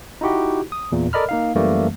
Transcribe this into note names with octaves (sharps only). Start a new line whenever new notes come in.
D#4 E4 F#4 G4
D#6
E2 A#2
A4 A#4 D5 D#5 B5 F6
A#3 D#4 F5
F#2 E3 G3 A3 A#3